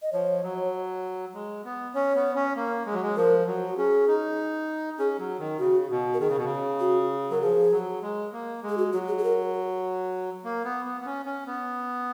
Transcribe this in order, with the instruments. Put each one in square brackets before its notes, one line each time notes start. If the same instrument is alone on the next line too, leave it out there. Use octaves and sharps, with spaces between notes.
[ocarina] D#5
[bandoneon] F3 [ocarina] C#5
[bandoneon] F#3
G#3
B3
[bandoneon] C#4 [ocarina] C#5
[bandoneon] B3
C#4
A#3
G#3
F#3
G#3
[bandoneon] F3 [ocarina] A#4
[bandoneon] F#3
[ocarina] F#4
[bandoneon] C#4 [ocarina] G#4
[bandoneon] D#4
[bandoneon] C#4 [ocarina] G#4
[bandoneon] F#3
D#3
[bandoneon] C#3 [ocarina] F#4
[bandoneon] B2
[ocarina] A#4
[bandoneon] D#3 [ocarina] G#4
[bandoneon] C#3
B2
C#3
[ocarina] F#4
[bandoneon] F#3 [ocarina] A#4
[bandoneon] F3 [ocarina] G#4
[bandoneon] F#3
G#3
A#3
G#3
[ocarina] G#4
F#4
[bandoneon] F#3 [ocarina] F#4
[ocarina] G#4
G#4
A#4
[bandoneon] A#3
B3
B3
B3
C#4
C#4
B3